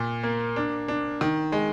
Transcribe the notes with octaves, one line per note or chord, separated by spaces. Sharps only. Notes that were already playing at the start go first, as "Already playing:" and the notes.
Already playing: A#2
A#3
D4
D4
D#3
G#3